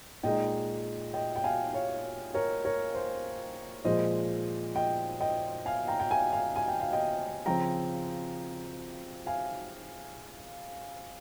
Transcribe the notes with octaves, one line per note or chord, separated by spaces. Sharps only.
A#2 G#3 D#4 D#5 G5
D#5 G5
G5
F5 G#5
C#5 F5
A#4 C#5
A#4 C#5
C5
A#2 F3 G#3 C5 D#5
D#5 G5
D#5 G5
F5 G#5
G5 A#5
G5
F5 G#5
F5 G#5
G#5
G5
F5
D#5 G5
C#3 F3 C4 G5 A#5
F5 G#5